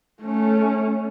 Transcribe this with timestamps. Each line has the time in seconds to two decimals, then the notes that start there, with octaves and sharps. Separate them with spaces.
0.22 A3 C#4